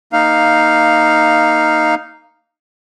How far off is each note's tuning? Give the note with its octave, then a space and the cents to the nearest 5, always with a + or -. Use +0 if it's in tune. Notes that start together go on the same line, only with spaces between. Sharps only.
A#3 -10 D#4 +0 F5 +0